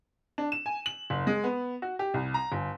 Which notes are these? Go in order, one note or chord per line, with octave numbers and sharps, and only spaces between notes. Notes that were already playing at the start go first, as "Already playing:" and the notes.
D4
E7
G#5
F#7
F#1
G#3
B3
F#4
G4
C2
A#5
G1